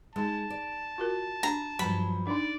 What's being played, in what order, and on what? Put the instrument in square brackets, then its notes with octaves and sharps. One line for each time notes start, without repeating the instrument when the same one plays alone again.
[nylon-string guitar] G#3 [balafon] D#4 G#4 [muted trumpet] A5
[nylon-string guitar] D5
[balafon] F4 F#4 A#4
[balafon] D4 [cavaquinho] A#5
[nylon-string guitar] G2 F3 F#3 [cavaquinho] B5
[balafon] D4 D#4 [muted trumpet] D5